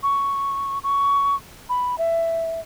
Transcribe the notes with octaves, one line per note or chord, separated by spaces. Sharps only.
C#6
C#6
B5
E5